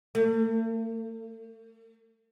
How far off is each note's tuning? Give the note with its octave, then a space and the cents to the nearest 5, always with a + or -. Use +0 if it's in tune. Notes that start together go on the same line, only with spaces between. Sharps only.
A3 +45